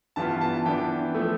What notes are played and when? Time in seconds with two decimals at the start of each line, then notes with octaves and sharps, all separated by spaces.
0.16 G2 E3 B3 F4 A5
0.41 A5
0.66 E3 B3 D4 G5
1.15 F3 A3